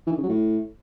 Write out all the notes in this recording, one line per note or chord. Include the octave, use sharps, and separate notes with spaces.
E3
D#3
C#3
F#3
A2